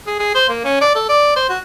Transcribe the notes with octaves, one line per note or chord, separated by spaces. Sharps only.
G#4
G#4
C5
A#3
C#4
D5
A4
D5
C5
F#4